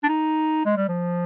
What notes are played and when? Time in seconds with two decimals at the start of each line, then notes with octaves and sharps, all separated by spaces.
0.03 D4
0.08 D#4
0.65 G#3
0.77 G3
0.88 F3